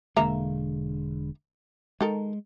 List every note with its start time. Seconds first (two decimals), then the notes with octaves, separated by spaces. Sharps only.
0.16 E1 D3 G#3 A#3 E5 A#5
2.01 D#3 G#3 A4 A#4